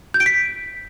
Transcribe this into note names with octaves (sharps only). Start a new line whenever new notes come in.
G6
D7
B6